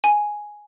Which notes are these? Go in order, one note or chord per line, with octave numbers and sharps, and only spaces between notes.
G#5